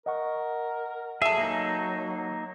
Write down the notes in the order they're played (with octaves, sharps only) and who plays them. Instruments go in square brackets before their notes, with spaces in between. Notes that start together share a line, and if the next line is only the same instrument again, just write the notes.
[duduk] A#4 [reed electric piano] D#5 F#5 C#6
[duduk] F#3 [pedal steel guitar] G#4 [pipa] A4 E5
[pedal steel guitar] A#3 D#4